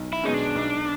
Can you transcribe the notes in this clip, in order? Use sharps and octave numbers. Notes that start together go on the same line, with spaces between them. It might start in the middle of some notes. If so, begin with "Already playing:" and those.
Already playing: B1
E4
B2 G#3 C#4 D#4
D4
B1